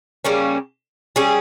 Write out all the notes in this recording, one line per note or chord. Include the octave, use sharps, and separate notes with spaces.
C#3 G3 A#3 C#4
G3 C#4 G#4